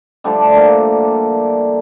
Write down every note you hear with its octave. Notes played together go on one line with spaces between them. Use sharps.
D3 F3 G3 A3 G4
A#3 A#4